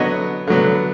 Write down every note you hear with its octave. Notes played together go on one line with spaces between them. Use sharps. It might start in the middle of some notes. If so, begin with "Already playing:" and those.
Already playing: D3 F#3 B3 C#5 D#5
D3 F#3 B3